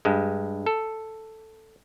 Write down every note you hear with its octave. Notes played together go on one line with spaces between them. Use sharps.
G2 G#3
A4